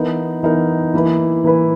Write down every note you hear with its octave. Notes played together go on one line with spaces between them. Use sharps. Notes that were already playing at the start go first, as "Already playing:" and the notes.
Already playing: E3 B3 D#4 A#4
E3 B3 D#4 A#4
E3 A#3 E4 B4
E3 A#3 E4 B4